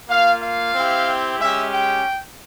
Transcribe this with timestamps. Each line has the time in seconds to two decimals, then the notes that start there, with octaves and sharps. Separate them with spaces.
0.08 A#3 F4 F5
0.41 F5
0.75 C4 E4 G4
1.40 G#3 C#4 G4 E5
1.72 G5